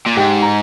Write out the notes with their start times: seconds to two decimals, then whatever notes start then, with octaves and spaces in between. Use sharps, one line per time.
0.06 A#2
0.17 G#2 G4 G5
0.42 A#5